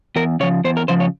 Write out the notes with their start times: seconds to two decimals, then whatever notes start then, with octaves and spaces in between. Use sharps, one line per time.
0.16 E2 A#4
0.40 C#3 F3 C#5
0.64 E2 C5
0.77 A#4
0.88 C#3 F3 C5
1.00 C#5